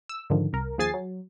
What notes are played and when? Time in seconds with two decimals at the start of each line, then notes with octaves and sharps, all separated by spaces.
0.09 E6
0.30 G#2 D3 D#3 F3
0.53 C2 A#4
0.78 D#2 F3 G#4 G#5 A6 C7
0.94 F#3